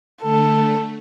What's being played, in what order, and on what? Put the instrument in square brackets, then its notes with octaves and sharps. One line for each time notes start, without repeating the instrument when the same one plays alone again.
[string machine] D3 A3 [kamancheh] A4